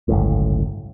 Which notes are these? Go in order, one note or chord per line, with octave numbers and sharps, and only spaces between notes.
G1 C#2 F#2 A2